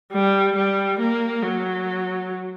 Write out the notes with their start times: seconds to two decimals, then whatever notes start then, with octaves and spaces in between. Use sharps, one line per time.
0.12 G3
0.56 G3
0.99 A#3
1.43 F#3